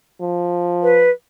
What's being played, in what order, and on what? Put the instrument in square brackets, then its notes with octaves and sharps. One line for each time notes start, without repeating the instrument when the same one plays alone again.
[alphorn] F3
[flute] B4